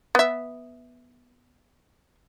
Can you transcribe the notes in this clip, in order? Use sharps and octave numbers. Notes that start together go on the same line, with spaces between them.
B3 E5